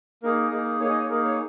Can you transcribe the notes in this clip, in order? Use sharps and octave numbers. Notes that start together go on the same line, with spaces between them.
A#3 D#4 G#4 A#4
A#3 D#4 G#4
A#3 D#4 G#4 C#5
D#5 G#5
C#5
A#3 D#4 G#4 A#4
C#5